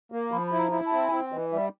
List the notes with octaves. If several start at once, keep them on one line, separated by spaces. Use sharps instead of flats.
A#3
F3 B5
E4 B5
A#5
E4
A5
C4
G#5
C4 G5
E3 D#5
G3 E5